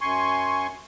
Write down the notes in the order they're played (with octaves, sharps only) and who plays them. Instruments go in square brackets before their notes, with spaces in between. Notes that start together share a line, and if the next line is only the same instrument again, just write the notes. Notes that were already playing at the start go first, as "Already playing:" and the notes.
[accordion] F#2 G#5 C6 C#6